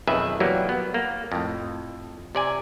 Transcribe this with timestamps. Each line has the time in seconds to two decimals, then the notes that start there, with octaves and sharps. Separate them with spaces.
0.07 B1 F2 D#3 G#4 B4 E5
0.40 E3 F#3 G3 A#3 E4
0.69 B3
0.94 A#3
1.32 F2 A2
2.35 C3 D5 G#5